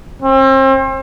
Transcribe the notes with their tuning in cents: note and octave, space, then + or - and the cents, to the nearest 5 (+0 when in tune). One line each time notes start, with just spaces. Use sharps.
C4 +40